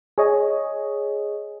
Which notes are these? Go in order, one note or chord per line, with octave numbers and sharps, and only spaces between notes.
G#4 C#5 D#5